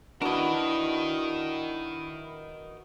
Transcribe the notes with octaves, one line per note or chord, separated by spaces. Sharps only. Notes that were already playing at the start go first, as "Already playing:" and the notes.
D4 E4 F#4 A#4 B4 D#5